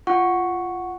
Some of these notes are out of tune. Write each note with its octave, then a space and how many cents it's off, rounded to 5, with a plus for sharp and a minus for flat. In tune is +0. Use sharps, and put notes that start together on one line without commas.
F4 -10 F#5 +0 C#6 +0